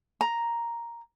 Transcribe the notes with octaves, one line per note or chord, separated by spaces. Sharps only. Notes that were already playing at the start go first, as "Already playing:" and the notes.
A#5